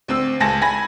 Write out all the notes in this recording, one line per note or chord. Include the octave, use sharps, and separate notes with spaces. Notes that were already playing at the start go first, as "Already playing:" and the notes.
D2 C4 E6
C#2 G#5 A5 A#6
G#5 B5 A#6